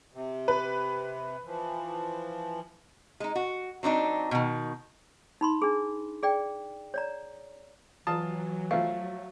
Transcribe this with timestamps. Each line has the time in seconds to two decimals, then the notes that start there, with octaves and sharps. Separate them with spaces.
0.14 C3
0.48 B4
1.45 E3 F3
3.20 G#3 D#4
3.35 F#4
3.83 F#3 C4 D4 D#4
4.31 B2 D#3
5.41 D#4 B5 C6
5.62 D4 G#4
6.23 G#4 D5 G5
6.94 C#5 D5 A#5
8.07 E3 F#3 F4 A5 D#6
8.71 F3 A3 F5